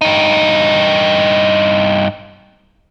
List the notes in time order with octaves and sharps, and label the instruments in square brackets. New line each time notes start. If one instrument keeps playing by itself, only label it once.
[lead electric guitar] G2 D#4